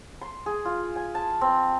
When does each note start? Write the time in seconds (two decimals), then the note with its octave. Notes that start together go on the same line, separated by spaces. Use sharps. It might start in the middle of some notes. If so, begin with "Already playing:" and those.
0.21 C6
0.46 G#4
0.65 F4
0.96 G#5
1.15 A5
1.41 C4